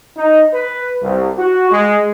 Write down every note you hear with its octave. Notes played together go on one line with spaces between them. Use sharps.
D#4
B4
C2
F#4
G#3